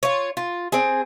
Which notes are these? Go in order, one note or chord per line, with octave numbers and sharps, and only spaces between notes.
F4 C#5
F4
C4 G#4